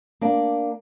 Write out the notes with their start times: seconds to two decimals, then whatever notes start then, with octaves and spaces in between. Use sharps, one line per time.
0.21 A#3 D4